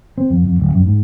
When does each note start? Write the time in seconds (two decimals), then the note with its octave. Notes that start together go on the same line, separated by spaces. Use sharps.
0.18 C4
0.30 F2
0.45 F2
0.59 D1
0.74 F#2
0.86 G#2